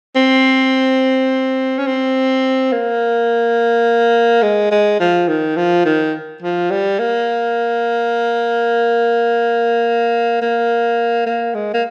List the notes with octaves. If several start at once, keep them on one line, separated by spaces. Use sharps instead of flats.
C4
C#4
C4
A#3
G#3
G#3
F3
D#3
F3
D#3
F3
G3
A#3
A#3
A#3
G#3
A#3